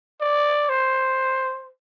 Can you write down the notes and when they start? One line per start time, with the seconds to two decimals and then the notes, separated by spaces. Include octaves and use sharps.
0.21 D5
0.69 C5